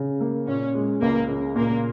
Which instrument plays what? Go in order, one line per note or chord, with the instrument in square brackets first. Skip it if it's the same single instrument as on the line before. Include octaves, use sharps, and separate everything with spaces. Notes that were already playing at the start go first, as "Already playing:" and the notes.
Already playing: [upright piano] C#3
A#3
[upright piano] A#2 [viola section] C#4
[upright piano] G#3
[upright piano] C#2 [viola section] A#3
[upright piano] C#3
[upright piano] A#2 [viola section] A#3